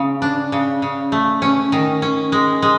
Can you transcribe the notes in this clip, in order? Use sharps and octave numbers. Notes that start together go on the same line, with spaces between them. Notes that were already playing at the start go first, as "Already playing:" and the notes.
Already playing: C#3
D4
C#3
C#3
A3
C#4
D#3
C#4
G#3
G#3